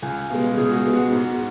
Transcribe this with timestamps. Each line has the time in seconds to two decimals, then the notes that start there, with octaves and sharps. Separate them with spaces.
0.02 C#2 G#5
0.30 B2 G#3 F5
0.57 C#2 G#4
0.71 F#4
0.85 B2 G#3
0.95 F#4
1.12 G#2